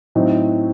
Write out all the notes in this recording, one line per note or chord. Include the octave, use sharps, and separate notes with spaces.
A2 F#3 C4 D#4